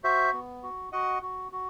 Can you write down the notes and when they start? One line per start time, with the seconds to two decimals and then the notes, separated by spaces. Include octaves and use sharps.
0.04 F#4 C5 E5
0.33 B3
0.63 F#4
0.92 F#4 D#5 F#5
1.22 F#4
1.52 F#4